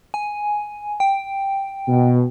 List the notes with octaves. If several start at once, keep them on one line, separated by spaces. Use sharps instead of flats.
G#5
G5
B2